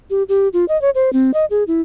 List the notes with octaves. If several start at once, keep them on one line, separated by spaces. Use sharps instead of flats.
G4
G4
F4
D#5
C#5
C5
C4
D#5
G#4
E4